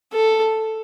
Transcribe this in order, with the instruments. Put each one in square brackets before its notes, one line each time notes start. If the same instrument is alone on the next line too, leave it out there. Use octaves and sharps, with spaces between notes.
[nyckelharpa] A4